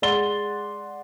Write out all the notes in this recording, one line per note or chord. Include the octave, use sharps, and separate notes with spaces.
G#3 D5 F#5 C6 A6 G7